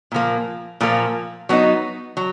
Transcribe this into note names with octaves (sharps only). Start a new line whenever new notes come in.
A#2 F3 A#3
A#2 F3 A#3
F#3 B3 D#4
F#3